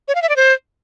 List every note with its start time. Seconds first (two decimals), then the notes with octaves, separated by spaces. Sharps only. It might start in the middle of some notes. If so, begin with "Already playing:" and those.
0.08 C#5
0.15 F5
0.22 E5
0.29 D5
0.36 C5